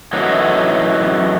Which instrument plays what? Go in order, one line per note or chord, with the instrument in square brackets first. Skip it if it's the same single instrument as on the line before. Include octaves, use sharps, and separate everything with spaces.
[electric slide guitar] F#2 A2 E3 F#3 D#4